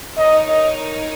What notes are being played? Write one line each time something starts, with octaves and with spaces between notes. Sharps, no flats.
D#4 A#4 C#5 D#5
D#5